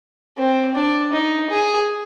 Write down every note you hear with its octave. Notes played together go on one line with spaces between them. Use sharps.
C4
D4
D#4
G#4